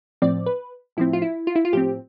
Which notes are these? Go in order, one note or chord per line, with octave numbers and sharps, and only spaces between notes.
A2 F3 C4 D5
B4
A2 F3 C4 E4
F4
E4
F4
E4
F4
A2 F3 C4 G4